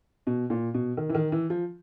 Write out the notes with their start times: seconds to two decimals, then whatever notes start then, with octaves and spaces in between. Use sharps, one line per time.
0.27 B2
0.50 A#2
0.74 B2
0.97 D#3
1.09 E3
1.15 D#3
1.32 E3
1.50 F3